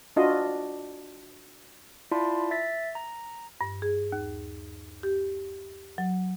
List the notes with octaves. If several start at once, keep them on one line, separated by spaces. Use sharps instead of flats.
D4 F4 F#4 D#5
E4 F4 D5 A5 B5 C6
E5 A6 B6
A#5
G2
G#4
D#2
G4
F#3